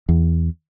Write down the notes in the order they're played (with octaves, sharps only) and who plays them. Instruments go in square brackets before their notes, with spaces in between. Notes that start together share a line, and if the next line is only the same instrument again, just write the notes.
[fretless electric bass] E2